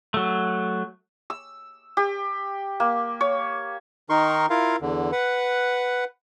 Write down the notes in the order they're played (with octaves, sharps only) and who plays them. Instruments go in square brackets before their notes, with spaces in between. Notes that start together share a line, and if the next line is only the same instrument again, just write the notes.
[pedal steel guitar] F#3 A3
[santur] E6
G4
A#3
C#5
[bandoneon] D#3 D#4 A#4 C6 C#6
E4 F4 A#4 F5
E2 D3
B4 F#5